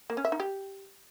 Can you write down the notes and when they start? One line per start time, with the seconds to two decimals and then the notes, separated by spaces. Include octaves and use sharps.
0.10 A#3
0.17 C#4
0.25 E5
0.32 D#4
0.40 G4